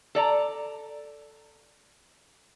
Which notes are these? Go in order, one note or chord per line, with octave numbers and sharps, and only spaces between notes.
A4 D5 A#5